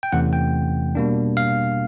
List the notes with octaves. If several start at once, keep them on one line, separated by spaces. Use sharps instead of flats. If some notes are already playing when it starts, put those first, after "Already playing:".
G5
E2 C3 E3 A3 C#4 F#5
G5
B2 G3 A#3 D4
F5